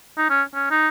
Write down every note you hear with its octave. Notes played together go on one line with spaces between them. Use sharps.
D#4
C#4
C#4
D#4